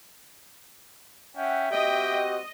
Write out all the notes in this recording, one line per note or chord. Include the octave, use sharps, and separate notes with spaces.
C#4 E5 F#5 G5
C4 F#4 G4 D#5 G5